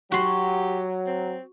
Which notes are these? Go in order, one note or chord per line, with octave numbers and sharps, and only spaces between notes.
F#3 F#4 G4 C6
C4